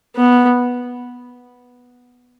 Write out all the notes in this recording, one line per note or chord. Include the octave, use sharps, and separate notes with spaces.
B3